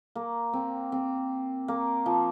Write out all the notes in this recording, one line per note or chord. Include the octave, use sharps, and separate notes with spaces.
A#3
C4
C4
A#3
F3